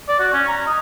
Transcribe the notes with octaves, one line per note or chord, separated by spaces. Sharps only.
D5
F#4
C#4
A#5
D#5